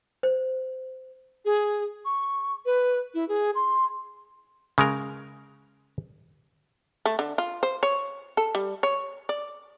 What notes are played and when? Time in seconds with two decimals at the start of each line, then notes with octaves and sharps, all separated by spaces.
0.23 C5
1.45 G#4
2.05 C#6
2.66 B4
3.14 E4
3.28 G#4
3.55 C6
4.78 C#3 G#3 A#4
7.06 A3
7.19 D3
7.38 F4
7.63 C5
7.83 C#5
8.37 A4
8.55 G3
8.83 C#5
9.29 D5